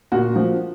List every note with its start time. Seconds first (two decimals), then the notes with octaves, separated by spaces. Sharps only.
0.12 A#2 F#4
0.36 F3